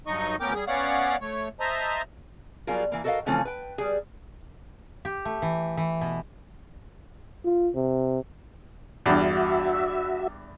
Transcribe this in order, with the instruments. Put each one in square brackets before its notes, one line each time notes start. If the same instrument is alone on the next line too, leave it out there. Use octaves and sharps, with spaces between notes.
[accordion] G2 F#3 D#4 D#5 C#6
D2 B3 C#4 A#4 G5 D6
G3 G#4
B3 C#4 C#5 D5 F5 F#5
A3 C#5
C5 D#5 E5 A5 A#5
[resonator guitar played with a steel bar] F#3 G3 B3 F4 G#4 A#4
E3 A#3
F#4 A4 A#4 D5 D#5 F5
C#3 E3 F3 A3 C4 C#4
B4 G5
G3 G#4
[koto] G4
A3
E3
E3
B2
[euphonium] F4
C3
[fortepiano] E2 G2 [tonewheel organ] F#4 E5